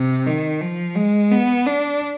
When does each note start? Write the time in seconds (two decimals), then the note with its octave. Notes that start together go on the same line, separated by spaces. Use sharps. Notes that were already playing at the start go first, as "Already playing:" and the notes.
Already playing: C3
0.26 D#3
0.61 F3
0.96 G#3
1.31 B3
1.67 D4